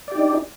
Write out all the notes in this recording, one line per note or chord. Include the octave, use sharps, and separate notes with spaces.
D4 D#4 G4 D5